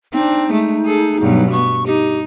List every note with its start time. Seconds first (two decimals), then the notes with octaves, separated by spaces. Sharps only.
0.13 C4 D4 D#4
0.49 G#3 A3
0.85 G#4 A4
1.20 G2 B2 F#3
1.52 B3 C#6
1.86 D#4 G4